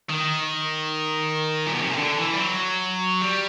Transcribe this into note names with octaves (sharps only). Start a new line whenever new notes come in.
D#3
A#2
B2
C3
C#3
D3
E3
G3
F#3
G3